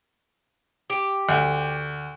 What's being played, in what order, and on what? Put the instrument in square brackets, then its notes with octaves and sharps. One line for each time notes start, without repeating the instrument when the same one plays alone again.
[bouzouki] G4
[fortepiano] D2